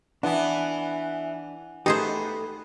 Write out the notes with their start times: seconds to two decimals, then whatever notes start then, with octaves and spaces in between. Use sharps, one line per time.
0.23 E3 B3 D4 F#5 G#5
1.86 A3 B3 D#4 G4 G#4 C5